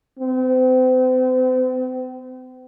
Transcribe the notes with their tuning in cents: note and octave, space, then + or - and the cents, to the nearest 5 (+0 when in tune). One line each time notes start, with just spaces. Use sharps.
C4 -40